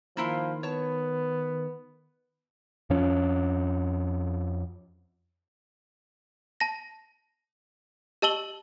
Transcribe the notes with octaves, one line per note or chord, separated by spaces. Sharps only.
D#3 F3 A#3 E4 F4
B3 C#5 A5
F2 F3 C#4
A5 A#6
G4 D#5 A5 E6 F#7 G7